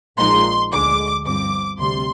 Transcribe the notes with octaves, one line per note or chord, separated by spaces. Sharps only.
A#1 A#2 F3 G#3 D#4 C6
D2 D3 G#3 D6
G1 G2 F3 C4 D6
D2 C3 G3 C6